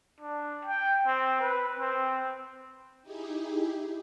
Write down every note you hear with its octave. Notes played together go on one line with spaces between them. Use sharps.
D4
G5
C4
B4
C4
D#4 E4 G4 G#4